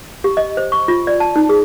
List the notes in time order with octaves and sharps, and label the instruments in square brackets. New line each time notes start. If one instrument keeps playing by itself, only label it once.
[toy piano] G4
D#5
C5
C#6
F4
D5
A5
D#4
G#4